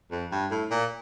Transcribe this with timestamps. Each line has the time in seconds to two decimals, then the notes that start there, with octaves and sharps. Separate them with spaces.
0.11 F2
0.32 G2
0.51 A2
0.71 A#2